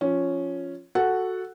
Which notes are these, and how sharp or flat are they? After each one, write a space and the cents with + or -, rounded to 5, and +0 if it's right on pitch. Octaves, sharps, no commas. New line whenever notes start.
F3 +0 C#4 +0
F#4 +0 A4 +0 F#5 +0